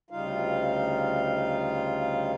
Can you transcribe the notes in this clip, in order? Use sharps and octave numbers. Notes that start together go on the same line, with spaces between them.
D2 C#3 G3 D#4 F4 F5